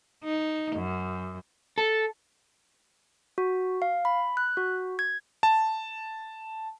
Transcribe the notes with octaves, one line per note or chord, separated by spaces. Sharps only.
D#4
F#2
A4
F#4
F5
B5
F#6
F#4
G#6
A5